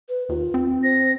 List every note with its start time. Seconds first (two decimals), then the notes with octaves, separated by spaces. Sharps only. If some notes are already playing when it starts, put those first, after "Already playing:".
0.09 B4
0.29 D#2 F4
0.54 C4
0.83 C5 A#6